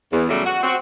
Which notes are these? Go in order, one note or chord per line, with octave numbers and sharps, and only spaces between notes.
E2
C#3 F#3 G3 A3
F#4
C4 F#4